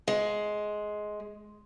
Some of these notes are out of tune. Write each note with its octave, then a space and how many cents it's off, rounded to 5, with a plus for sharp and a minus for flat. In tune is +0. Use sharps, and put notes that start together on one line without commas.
G#3 +15